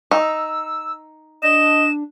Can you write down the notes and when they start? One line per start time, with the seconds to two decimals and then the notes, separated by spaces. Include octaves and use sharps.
0.11 D#4 E6
1.43 D4 D#5 E7